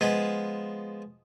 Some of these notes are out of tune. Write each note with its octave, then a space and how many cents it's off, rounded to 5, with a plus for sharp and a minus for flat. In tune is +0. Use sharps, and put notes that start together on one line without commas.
F3 +0 G#3 +0 B3 +0